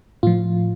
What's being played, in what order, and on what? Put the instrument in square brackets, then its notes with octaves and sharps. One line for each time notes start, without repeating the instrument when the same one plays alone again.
[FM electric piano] A2 F3 F4